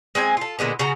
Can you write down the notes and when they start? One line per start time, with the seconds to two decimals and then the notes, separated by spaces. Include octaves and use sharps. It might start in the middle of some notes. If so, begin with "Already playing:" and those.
0.15 G#3 C4 D4 G#5
0.37 F4 A4
0.59 A#2 D3 G#3 B3
0.79 C#3 F#4 A#5